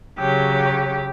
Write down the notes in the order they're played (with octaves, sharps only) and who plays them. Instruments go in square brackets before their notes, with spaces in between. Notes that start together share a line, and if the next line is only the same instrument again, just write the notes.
[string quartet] C#3 F#3 G4